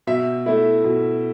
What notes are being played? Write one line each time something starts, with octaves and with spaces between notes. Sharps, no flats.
B2 E5
A3 E4
B2